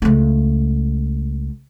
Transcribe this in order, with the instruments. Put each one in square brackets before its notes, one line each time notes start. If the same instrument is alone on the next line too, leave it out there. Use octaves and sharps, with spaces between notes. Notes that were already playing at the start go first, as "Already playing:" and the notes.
[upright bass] C#2 A3